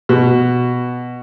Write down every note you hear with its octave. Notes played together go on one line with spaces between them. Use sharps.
B2